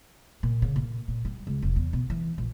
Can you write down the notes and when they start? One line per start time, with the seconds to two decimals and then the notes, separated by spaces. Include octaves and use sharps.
0.43 A#2
0.62 C#3
0.76 A#2
1.08 A#2
1.25 G3
1.47 C#2
1.62 F1
1.76 E2
1.93 B2
2.10 E3
2.38 A#1